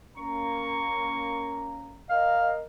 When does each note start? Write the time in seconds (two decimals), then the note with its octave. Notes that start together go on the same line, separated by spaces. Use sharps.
0.17 A#3 C#4 A#5 C#6
2.09 A#4 D#5 F5